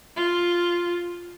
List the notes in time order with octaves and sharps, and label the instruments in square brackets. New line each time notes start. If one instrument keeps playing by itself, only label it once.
[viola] F4